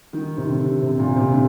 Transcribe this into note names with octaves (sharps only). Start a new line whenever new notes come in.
D#3
C3
D3
C3
A#2
C3
D3